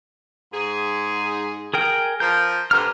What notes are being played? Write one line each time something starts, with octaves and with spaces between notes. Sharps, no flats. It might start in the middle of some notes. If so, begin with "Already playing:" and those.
G#2 G#4
G#4 A#4 G5
F3 A#4 G6
G2 D3 C5 A#5 F6